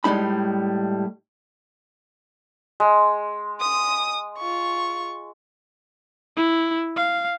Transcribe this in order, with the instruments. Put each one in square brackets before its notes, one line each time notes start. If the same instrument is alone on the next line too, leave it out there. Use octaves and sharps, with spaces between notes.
[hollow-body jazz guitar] A2 G3 G#3 D#4 B5
[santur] G#3
[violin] D#6
F4 C#6
[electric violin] E4
F5